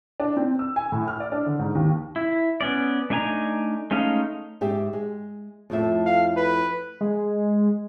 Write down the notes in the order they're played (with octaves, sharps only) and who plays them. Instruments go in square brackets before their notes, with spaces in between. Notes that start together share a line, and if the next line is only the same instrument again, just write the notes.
[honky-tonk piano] D4
C4
E6
G#5
A2
F6
D5
D4
D3
G#2
D#2
[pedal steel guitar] E4
B3 C#4 D5
A3 D4 D#4 G#5 A#5
G#3 A3 C#4 D#4 F5
[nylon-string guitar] G#2 G4 E5
G#3
F2 A2 E5
[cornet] F5
B4
[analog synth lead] G#3